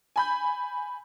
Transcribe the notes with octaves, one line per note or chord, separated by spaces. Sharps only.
G#5 B5 G6